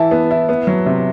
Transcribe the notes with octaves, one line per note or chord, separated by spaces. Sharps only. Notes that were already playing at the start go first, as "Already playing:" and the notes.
Already playing: E3 E4 A5
B3
E4
B3
F#3
C3